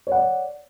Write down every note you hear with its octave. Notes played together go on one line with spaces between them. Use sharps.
C#5 D5 F#5